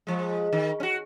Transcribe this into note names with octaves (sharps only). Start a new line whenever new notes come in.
F3 G#3
D#3
C#4 F#4